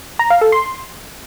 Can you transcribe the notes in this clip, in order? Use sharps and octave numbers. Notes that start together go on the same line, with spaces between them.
A#5
F5
A4
C6